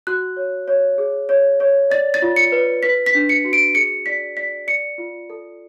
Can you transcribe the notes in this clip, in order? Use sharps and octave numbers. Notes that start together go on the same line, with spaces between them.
F#4 F#6
C#5
C#5
G#4
C#5
C#5
D5 A6
A6
F4
C#7
B4
B4 B6
B6
D4
C#7
F#4
D7
G#4 C#7
D5 B6
D5 B6
D5 C#7
F4
A4